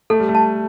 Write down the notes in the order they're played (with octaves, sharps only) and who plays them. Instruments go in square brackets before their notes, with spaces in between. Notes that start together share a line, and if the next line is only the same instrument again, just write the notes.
[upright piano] A3 [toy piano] A4
[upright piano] G3
A3
[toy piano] A5